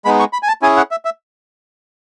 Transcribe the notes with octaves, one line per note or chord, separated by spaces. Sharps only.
G#3 B3 D#4 B5
C#6
B5
G#5
A5
C#4 E4 G#4 G#5
F#5
E5
E5